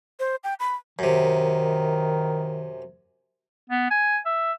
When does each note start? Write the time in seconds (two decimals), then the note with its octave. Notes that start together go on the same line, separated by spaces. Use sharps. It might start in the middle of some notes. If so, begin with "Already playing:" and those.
0.20 C5
0.44 G5
0.60 B5
0.99 F#2 C3 D#3
3.70 B3
3.91 G#5
4.26 E5